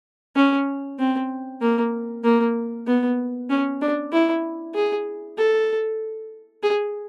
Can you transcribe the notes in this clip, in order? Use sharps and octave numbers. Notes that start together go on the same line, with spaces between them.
C#4
C4
A#3
A#3
B3
C#4
D4
E4
G#4
A4
G#4